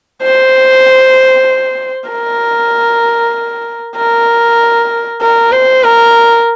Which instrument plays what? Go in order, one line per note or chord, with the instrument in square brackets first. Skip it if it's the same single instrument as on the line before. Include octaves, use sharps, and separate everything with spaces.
[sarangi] C5
A#4
A#4
A#4
C5
A#4